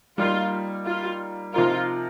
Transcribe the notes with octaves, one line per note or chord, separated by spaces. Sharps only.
G3 A#3 D#4 F4 A#4
F4
C3 F3 D#4 F4 A#4